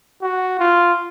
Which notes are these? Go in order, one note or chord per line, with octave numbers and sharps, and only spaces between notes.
F#4
F4